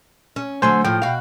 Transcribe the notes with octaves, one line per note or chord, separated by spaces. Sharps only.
C#4
D3 F#3 A3 C5 G#5 C6
A2 F3 G5
B2 F#4 F5